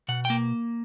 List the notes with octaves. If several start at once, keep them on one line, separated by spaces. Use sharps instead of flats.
B2 F#5
A#3 G5